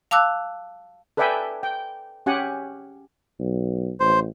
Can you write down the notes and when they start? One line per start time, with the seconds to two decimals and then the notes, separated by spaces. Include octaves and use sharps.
0.11 F5 A5 D6 E6 F#6
1.17 A4 B4 D5 E5 G5 G#5
1.63 G5
2.26 C#4 G4 F#5 G#5
3.40 B1
4.00 A1 C5